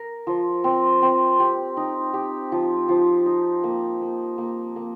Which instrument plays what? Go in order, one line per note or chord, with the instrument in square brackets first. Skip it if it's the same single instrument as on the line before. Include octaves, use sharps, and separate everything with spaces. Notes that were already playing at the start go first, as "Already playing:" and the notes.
Already playing: [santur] A#4
F3
C4
C4
G4
D#4
G4
F3
F3
D#4
A#3
A#3
A#3
A#3